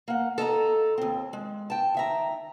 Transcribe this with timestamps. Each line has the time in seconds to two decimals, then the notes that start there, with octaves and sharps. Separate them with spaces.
0.08 A#3 F#5
0.38 A4 D#5 G#5 A#5
0.98 D#2 C4
1.33 G#3
1.70 G5 A5
1.95 D#3 E5 A#5